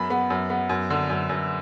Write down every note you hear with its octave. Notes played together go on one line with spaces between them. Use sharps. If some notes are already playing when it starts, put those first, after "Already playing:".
Already playing: F#2 B3 B5
B3
F#2
B3
F#2
D3
F#2
F#2